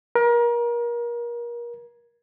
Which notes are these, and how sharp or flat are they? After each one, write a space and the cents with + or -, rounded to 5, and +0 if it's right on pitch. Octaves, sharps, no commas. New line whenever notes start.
A#4 +30